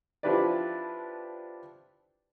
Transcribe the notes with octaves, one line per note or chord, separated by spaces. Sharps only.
F3 D4 E4 G4 B4 D5